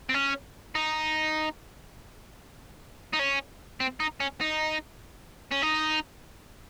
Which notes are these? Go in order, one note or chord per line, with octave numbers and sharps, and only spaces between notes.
C4
C#4
D#4
D#4
C#4
C4
D#4
C#4
D#4
C#4
D#4